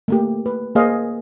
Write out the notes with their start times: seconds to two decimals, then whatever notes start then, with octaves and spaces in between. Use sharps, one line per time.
0.08 A3 A#3 G4
0.46 B4
0.75 A#3 G#4 C5 D#5 F5